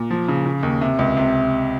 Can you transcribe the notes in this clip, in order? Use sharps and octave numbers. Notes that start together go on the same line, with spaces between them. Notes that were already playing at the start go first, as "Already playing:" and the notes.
Already playing: A#2
F3
C#3
C#3
D#2
C3
C#2
C3